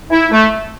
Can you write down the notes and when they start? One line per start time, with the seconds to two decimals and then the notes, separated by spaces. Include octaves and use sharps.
0.10 E4
0.31 A3